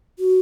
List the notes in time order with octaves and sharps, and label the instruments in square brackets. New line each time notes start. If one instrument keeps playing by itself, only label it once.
[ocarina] F#4